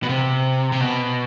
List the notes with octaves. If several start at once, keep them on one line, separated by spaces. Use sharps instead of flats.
B2
C3
C3
B2